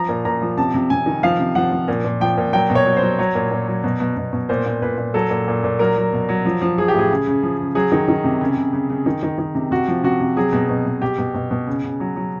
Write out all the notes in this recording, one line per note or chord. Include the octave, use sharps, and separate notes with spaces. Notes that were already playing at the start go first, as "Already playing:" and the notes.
Already playing: F3 A#5
A#2
A#2 A#5
F3
C3 A5
C3
C3 G#5
D#3
F3 F5
C3
F3 F#5
F3
A#2
A#2
F3 G5
A#2
F#3 G5
B2
C#5
F#3
C5
F#3
F#3 C#5
A#2
A#2
F#3
B2
B2
B2
B2
A#2 C5
A#2
A#2 B4
A#2
F#3 A4
A#2
A#2
A#2
F#3 A#4
F#3
B2
F#3
F3
F3
F3 G#4
G4
A2 G#4
C#3
C#3
F3
C#3
F#3 G#4
D#3
D#3
C3
C#3
C#3
C#3
C#3
D#3
D#3
D#3
C3
C3 F#4
F3
C3 F#4
C3
F#3 G#4
B2
B2
B2
B2 G4
B2
B2
B2
C#3
C#3
F#3
F#3